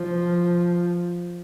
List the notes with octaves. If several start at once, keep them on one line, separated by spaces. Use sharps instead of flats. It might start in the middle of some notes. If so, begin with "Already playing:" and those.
Already playing: F3